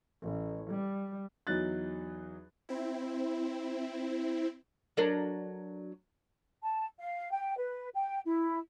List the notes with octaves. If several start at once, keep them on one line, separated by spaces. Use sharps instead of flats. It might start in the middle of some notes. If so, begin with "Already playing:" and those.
A1
G3
E2 F#3 D#4 F#6 A6
C4 E4
F#3 D4 A#4
A5
F5
G5
B4
G5
E4